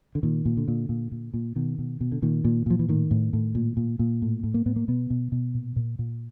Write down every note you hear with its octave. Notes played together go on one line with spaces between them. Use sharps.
D3
A#2 D#3
A#2
D3
A#2
A#2
A#2
A#2
B2 D#3
B2
B2
D3
A#2 D#3
A#2
A#2 F3
E3
A2 D#3
A2
A2
A#2
A#2
A#2
A2
A2
A#3
A2 B3
A#3
B2 B3
B2
B2
A#2
A#2
A#2